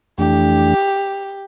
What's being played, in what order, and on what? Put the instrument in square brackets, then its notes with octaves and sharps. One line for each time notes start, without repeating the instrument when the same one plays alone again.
[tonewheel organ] F2 E3 A3 D4 [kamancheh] G4